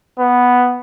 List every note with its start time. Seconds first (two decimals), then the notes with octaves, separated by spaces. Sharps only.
0.19 B3